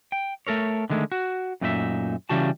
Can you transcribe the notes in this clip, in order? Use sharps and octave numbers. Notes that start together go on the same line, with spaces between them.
G5
A3 A4 A#4 C#5
D3 D#3 G#3 A3
F#4
F#2 A#2 A3 D#4 A#4 E5
C#3 E3 G3 F#4 A5